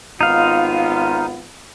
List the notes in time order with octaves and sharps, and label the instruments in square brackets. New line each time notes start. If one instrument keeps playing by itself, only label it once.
[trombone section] G#1 B3 F4 [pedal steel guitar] D#4 F5